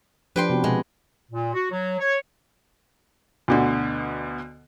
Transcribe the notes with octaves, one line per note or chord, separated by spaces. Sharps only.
F3 D4 G4 B4 G5 C6
C3 B3 F#4
B2 G#3
A#2
F#4
F#3
C#5
D2 B2 D3